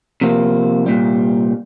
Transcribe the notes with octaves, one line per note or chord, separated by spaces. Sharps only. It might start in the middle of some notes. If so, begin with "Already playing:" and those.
C3 F3 A#3
C2 A#2 G3